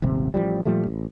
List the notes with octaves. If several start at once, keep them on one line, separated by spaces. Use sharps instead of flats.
D#1 G#1 C3
A1 C#3 F3 G3
A#2 F3 G3 A3
A1